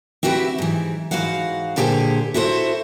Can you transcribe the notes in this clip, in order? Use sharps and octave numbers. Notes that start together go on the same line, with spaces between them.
C4 E4 F#4 G4 A#4 B4
G#2 E3
G#2 E3 F#4 F5 F#5
A#2 D3 G4 G#4 A#4 C5
E4 F#4 A4 C5